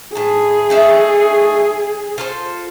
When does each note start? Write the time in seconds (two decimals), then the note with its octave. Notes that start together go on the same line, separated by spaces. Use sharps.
0.15 A2 G#4 A5
0.70 A3 D#4 E5
2.18 F4 A4 C5